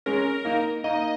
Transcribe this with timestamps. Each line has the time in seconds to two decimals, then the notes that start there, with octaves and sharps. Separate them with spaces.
0.06 G#3 C#4 A#4
0.45 A#3 D#4
0.84 A#3 D#4 D#5